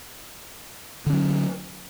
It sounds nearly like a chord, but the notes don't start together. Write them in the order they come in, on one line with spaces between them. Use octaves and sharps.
D3 C#4 F#3